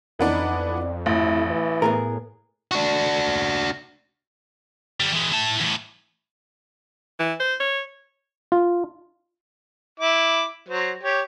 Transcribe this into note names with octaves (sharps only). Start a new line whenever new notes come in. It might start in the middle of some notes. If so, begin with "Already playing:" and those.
F2 E3 B3 D4 D#4
D5
A1 E4
E3
A2 B3 G#4 A#4
D4 F#4
D3 G3
E3 G#3
E4 A5
E2 A2
E3
C5
C#5
F4
E4 D6
F#3 C5
G4 C#5